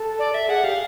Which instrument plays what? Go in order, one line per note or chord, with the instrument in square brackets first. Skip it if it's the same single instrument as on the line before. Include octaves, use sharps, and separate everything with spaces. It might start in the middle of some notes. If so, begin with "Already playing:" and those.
Already playing: [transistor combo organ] A4
[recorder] D5
E5
[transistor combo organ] G#4 [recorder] F#5
[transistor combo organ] G4 [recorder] F5